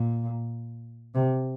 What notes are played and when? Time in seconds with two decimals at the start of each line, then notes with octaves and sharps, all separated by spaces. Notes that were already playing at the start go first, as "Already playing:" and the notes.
Already playing: A#2
1.15 C3